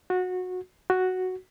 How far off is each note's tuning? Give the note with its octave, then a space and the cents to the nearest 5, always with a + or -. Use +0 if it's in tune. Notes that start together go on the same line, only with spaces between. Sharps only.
F#4 -20
F#4 +0